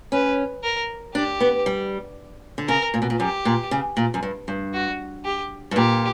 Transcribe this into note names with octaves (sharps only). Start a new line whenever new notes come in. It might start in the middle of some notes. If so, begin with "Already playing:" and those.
C#4 B4
A#4
D4 G4
B3
G3
D3
C#3 A#4
A#2
B2
A#2
F#2 G4
A#2
C#3
A#2
F#2
G2
G2
F#4
G4
G2
A#2 G4